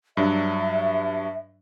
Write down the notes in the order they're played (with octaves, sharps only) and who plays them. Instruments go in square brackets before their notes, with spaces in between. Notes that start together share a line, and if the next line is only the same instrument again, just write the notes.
[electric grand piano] G2 F#3 D4 [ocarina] E5